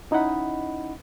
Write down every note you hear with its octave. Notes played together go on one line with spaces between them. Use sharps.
C#4 D#4 E4 D#5 F#5 B5